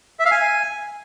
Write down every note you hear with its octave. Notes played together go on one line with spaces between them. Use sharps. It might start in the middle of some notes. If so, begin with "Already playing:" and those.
E5
F5
G#5